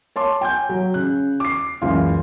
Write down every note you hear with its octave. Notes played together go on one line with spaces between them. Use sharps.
C#5 A5 C6 D6
G5 G#5 G6
F#3
C#3 F#6
D6 C7
F#1 C#2 E3 F4 F5